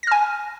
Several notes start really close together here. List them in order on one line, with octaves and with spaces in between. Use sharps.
A#6 F6 G#5